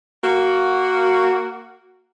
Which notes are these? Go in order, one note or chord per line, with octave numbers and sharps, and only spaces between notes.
A#3 F#4